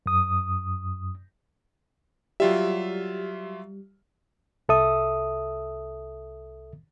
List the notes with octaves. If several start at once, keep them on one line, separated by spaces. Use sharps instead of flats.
F#2 D#6
F#3 G3 F4 E5
C2 A4 E5 D#6